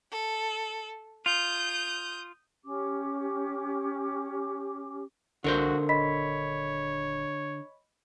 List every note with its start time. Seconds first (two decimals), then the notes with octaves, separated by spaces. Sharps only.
0.11 A4
1.26 F4 D#6 G6
2.64 C#4 G4 D6
5.44 C2 D3 F#4 A#4 C5
5.89 D#1 C#5 D#5 B5 B6